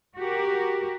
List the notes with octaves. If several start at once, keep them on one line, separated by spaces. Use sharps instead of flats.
F#4 G4 A#4